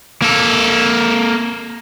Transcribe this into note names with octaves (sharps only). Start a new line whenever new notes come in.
A#3 A4